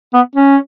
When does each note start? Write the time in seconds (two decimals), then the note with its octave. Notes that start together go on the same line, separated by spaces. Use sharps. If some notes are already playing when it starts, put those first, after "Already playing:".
0.14 B3
0.36 C#4